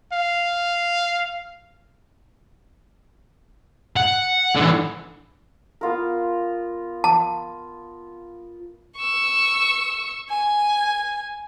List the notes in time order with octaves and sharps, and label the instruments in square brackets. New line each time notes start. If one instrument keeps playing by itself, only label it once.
[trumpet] F5
[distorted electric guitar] F#5
D3 E3
[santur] B3 F4 A#4
[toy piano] A5
[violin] C#6 E6
G#5